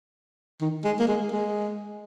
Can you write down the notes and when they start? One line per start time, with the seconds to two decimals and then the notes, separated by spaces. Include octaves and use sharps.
0.61 D#3
0.84 G#3
0.99 A#3
1.08 G#3
1.32 G#3